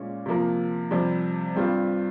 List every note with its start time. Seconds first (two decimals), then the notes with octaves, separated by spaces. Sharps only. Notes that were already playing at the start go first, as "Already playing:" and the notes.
Already playing: A#2 G#3 C#4
0.26 C3 F3 A#3
0.91 F2 C3 G3
1.56 G2 G3 C4 F4